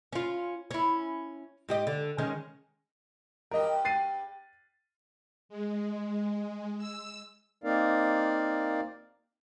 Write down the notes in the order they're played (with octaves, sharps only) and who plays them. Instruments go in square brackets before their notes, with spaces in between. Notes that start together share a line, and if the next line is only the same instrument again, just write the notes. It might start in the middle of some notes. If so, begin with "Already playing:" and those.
[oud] C#4 F4
C#4 E4
G#2 G4 D#5
D3
D#3 G#3 C#4
[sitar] G2 G4 [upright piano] A#4 D#5
[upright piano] A6 C7 D#7
[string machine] G#3
E6
[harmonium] A#3 C4 D#4 A#4 D5 F5